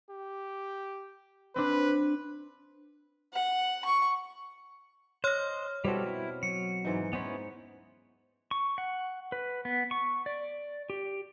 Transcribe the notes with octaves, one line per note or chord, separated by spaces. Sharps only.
G4
C4 D4 B4
F#5
C#6
C5 C#5 D#5 F6
B2 G3 C4 E4 F#4 A4
E4
F#3 C#7
G#2 E3 D#4
B3 C#4 D#4 E4 C5
C#6
F#5
B4
B3
C#6
D5
G4